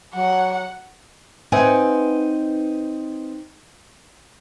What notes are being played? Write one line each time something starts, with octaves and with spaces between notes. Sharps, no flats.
F#3 F#5
C4 D#4 B4 E5 F#5 G#5